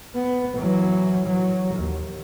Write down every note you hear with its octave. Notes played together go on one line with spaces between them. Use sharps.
B3
E3 F#3
F#3
D#2